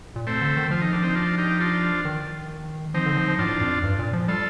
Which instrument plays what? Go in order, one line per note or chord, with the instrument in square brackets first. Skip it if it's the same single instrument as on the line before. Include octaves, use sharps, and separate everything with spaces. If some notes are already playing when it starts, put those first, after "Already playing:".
[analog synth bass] A#2
[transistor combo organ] A3 C4
[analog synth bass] D3
D#3
[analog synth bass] F3 [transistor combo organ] F4
[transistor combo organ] D#4
D4
C4 D#4
D4 F4
D#4 G4
D4 F4
[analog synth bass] D#3
[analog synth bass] F3 [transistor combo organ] C4 D#4
[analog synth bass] D3
F3
F3
[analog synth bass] A2 [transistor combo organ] D4 F4
[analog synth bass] F2
G2
A#2
F3
[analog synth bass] G3 [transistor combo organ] F4 A4